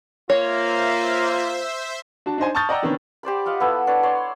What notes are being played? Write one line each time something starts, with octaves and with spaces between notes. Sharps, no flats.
A#3 F4 C5 C#5 E5
D4 F#4 A5
D4 D#4 C5 G#5
A5 C#6 D#6 F6 G6 A6
D5 D#5 F#5 G5 A#5 E6
C3 D#3 B3 C#4 D4
G4 C5 D5 B5
F4 D#5 F5 F#5
B3 E4 A4 B4
D4 B4 C#5
C#5 D5 C6